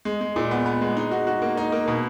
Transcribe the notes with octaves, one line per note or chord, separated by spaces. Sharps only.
G#3
G#3
A#2
B3
B3
G#3
D#4
F#4
F#4
A#3
D#4
A#3
B2